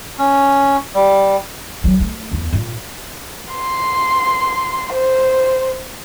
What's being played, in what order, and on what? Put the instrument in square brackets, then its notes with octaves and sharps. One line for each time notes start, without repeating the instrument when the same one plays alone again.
[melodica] C#4
G3
[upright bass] F#3
A3
E2
A#2
[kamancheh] C6
C5